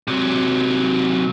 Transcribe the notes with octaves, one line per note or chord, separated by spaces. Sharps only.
C3 F#3